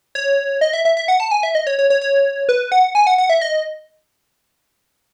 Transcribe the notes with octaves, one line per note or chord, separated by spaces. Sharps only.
C#5
D#5
E5
E5
E5
F#5
A5
G#5
E5
D#5
C#5
C#5
C#5
C#5
B4
F#5
G#5
F#5
F#5
E5
D#5